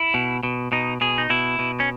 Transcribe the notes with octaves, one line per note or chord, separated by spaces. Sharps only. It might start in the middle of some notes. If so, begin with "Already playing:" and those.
Already playing: E4
B2
B2
B2 D#4
B2 G#4
D#4
B2 E4
B2
C#4